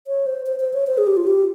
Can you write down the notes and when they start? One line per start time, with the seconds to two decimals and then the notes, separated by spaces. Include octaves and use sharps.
0.07 C#5
0.26 C5
0.46 C5
0.60 C5
0.73 C#5
0.87 C5
0.98 G#4
1.07 G4
1.17 F4
1.27 G4